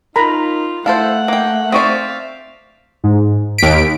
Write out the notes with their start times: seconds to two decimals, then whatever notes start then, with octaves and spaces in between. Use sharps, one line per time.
0.16 D#4 F4 A#4 A#5 B5
0.86 A3 E4 A4 C5 F5 F#5
1.28 A#3 G5
1.72 C4 C5 D5 E5 F5 C#6 D#6
3.04 G#2
3.58 D#2 B6 D7